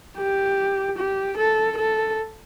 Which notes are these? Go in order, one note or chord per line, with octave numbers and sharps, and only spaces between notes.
G4
G4
A4
A4